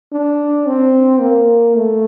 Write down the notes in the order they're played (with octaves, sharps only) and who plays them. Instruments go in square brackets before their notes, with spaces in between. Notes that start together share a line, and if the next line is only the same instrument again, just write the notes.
[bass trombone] D4
C4
A#3
A3